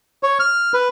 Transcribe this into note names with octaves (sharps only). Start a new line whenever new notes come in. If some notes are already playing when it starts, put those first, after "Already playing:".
C#5
F6
B4